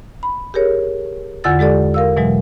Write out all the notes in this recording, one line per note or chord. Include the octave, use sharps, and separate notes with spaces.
B5
G4 G#4 A#4 C#5
E2 D3 F4 F#5 E6 A6
G#3 G4 A4 D5
A#4 F5 E6
B2 E3 F#3 G#3